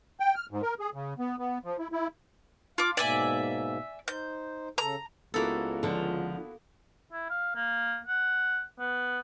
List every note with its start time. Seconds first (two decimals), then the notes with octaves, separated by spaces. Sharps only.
0.20 G5
0.35 F6
0.51 G#2
0.62 A#4
0.80 G#4
0.94 C#3
1.19 B3
1.39 B3
1.64 F3
1.79 E4
1.92 E4
2.78 F4 F5 D6
2.97 G#2 B2 A#3 D5 E5 G#5
4.08 D#4 C5 G6
4.78 C#3 A4 A#5
5.34 C#2 A#3 B3 E4 F#4 A4
5.83 D3 F3
7.12 E4
7.30 F5
7.56 A#3
8.06 F#5
8.79 B3